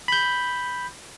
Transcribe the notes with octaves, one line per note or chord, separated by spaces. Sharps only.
B5 G6